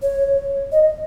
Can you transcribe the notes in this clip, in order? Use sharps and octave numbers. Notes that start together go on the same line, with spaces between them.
C#5
D#5